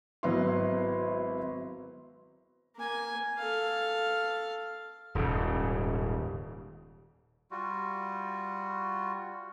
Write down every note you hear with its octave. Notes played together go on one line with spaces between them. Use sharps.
G#1 F#3 B3 E4 E5 C6
A#3 G#5
A4 F5
D#1 G#2 C#3
G3 F4 F#4